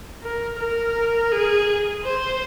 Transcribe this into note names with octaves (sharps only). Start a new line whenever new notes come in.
A#4
A#4
G#4
C5